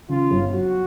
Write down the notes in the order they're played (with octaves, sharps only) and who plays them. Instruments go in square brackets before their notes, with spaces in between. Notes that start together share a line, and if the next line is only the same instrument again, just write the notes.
[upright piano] C#3 [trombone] F4
[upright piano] G1
[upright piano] F#3 [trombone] F#4